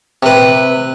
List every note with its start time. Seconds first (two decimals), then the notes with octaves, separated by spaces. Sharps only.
0.23 C3 B4